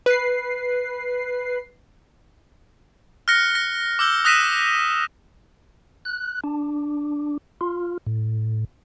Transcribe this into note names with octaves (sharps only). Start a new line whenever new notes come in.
B4 C7
F6 F#6 A#6 C#7
A#6
D6 E6 G6 G7
D#6 F#6 A#6 B6 D#7 E7
F#6
D4
F4
A2